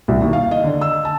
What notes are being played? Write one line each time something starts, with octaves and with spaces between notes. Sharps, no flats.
C2
D#2
F5
D#5
D3
E6
A5